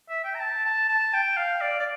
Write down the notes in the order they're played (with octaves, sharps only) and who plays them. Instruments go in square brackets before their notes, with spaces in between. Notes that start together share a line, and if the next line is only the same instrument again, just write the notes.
[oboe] E5
G5
A#5
A5
A5
A5
G5
F5
D5
D5